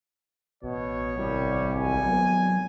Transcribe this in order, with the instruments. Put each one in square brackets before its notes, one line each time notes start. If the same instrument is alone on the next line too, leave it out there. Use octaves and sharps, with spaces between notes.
[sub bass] A1 [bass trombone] B2 [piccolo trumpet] C#5
[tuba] C2 [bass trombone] G3
[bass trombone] G#1 [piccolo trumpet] G#5
[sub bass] F#3 [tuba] B3